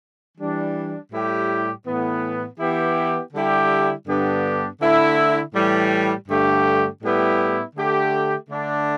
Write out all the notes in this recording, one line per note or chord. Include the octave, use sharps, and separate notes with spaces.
E3 G3 D4
A2 G3 E4 G4
A2 E3 B3
E3 B3 E4 G4
D3 G3 E4 G4
G2 D3 B3 D4 G4
D3 A3 E4
A2 E3 G3
G2 D3 A3 G4
A2 G3 B3 E4 G4
D3 A3 G4
D3 A3 D4